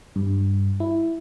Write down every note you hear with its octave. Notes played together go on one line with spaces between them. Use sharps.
G2
E4